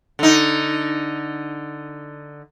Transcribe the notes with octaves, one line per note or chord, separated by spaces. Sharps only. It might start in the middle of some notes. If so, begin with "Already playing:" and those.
D3 D#4